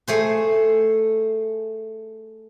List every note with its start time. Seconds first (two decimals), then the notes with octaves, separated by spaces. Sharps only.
0.08 A3 G#4 C5